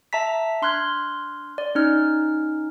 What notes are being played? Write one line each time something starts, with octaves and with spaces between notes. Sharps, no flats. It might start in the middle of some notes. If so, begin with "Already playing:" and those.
E5 A5 A#5 B6
D4 C6 F6 F#6 G#6
D5
C#4 D#4 F6